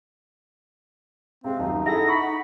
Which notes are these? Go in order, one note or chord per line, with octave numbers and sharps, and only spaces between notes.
C3 G#3 C4 F5
D#1 F#2 D#4
E4 G#4 A4 F#5 A#6
B5 C#6